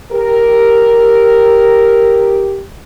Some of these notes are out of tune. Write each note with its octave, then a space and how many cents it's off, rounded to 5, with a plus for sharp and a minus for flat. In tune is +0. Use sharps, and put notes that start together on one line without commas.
G4 +0 A#4 +0